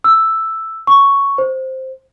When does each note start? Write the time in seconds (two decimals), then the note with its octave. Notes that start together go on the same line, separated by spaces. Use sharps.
0.04 E6
0.87 C#6
1.38 C5